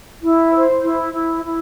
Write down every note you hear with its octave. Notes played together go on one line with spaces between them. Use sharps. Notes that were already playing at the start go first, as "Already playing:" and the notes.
E4
C5
E4
E4
E4